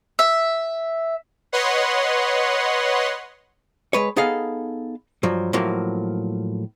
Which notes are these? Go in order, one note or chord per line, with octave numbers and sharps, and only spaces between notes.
E5
B4 C#5 D#5 F#5 C6
G#3 B4 C#5
B3 D#4 G#4 A4 F5
G2 F3 F#3
A2 F3 F#3 A#3